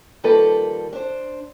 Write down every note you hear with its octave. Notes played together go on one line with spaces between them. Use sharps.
D#3 F3 G3 A#3 A4 B4
D4 C5